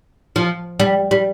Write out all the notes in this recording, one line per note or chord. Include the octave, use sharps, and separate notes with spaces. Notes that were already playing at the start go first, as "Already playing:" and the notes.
F3
G3
G3